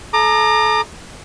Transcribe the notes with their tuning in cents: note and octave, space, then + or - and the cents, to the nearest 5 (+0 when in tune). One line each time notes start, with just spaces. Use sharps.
A4 -30 A#5 +0 D6 +40